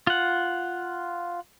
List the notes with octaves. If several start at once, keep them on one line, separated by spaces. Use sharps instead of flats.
F4 F#5